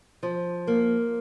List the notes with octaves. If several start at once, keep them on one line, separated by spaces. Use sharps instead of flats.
F3
A#3